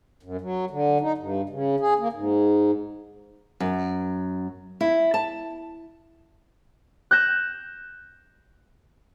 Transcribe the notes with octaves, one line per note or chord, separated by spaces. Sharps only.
F#2
F#3
D3
D#4
G2
C#3
G#4
A#3
G#2
F#2
E4
A5
F#6 G6 A#6 E7